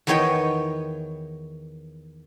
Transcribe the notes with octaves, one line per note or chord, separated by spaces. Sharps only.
E2 D#3 B3 C#5 D#5 G5